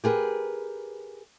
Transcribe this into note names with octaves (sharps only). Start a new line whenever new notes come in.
G4 G#4 A#4 B4